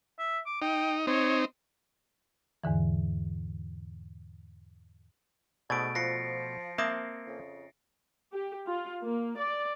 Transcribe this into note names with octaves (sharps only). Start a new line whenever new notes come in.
E5
D6
D#4 G5
C4 D#4 C#5
E2 G#2 D3 E3
G#2 B2 A3 G#4 D5 D#6 A6 D7
F3 F4 C5 A#6 C7 C#7
A#3 C4 E5 A5 D#6
F2 C#3
G4
F4
A#3
D5